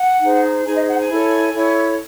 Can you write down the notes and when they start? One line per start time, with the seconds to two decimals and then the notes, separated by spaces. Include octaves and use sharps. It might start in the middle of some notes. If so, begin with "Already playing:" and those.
Already playing: F#5
0.21 D#4 G#4 C5
0.65 D#4 G#4 C5 G#5
0.76 D#5
0.87 F#5
0.98 G#5
1.09 E4 A4 C#5
1.53 E4 A4 C#5